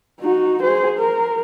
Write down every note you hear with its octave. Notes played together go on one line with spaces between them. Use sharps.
D#4 F#4
G#4 C5
A#4